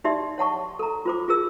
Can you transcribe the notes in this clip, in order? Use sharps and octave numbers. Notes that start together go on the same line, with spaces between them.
D#4 G4 D5 E5 C6
C#5 F#5 A5 C#6
A4 A#5
F4 C5 D6
F4 G#4 A#4 E6